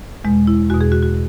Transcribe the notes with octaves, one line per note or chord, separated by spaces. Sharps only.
E2 B2 G#3
E4
E2 B2 F#4
G#4
F#4
F#4